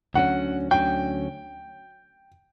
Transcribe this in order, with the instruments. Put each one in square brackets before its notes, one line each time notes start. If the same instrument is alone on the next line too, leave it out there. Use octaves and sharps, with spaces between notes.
[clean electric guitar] D2 D3 F#3 C#4 [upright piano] F#5
[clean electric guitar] D2 D3 F#3 C#4 [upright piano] G5